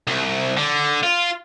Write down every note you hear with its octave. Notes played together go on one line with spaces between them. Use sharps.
C2
D3
F4